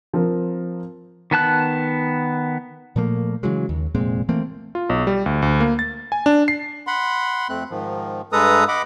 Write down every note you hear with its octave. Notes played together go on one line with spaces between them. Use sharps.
F3 C4 A#4
D#3 B3 A5 F#6
A#2 F3 A3 A#3
C#3 E3 F#3 G#3
D#2
F1 A#2 G#3 C4
E3 A3 A#3 C4
F4
B1
G3
D2
D2
A#3
A6
G#5
D4
C7
F#5 B5 C6
F2 A3 C4 F#6
G#2 D#3 F3
G2 G#3 A4 B4 A#5 D#6
D#5 F#5 B5 D6